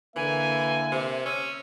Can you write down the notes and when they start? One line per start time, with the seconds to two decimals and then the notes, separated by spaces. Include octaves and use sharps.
0.16 D3 E3 A#3 E5 G#5
0.92 C3
1.25 C#4 E6